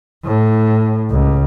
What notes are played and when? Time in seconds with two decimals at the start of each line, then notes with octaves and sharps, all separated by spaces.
0.25 A2
1.11 C#2